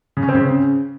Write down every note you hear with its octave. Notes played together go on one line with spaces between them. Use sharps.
C#3
C#4
C4
C#3